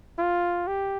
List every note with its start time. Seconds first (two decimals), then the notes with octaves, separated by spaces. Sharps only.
0.19 F4
0.67 G4